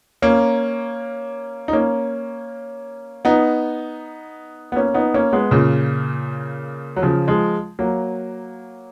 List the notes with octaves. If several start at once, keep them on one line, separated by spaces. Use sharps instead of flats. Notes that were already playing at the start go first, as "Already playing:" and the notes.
A#3 C#4
D#4
A#3 C#4
B3 D#4
B3
A#3 C#4
B3 D#4
A#3 C#4
G#3 B3
A#2 C#3
F#3
C#3 F3
F3 G#3
F#3 A#3